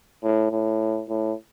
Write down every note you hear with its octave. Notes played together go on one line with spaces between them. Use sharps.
A2
A2
A2